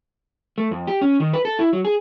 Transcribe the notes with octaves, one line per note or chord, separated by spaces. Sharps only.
A3
F2
G4
C#4
D#3
B4
A4
E4
F#3
G#4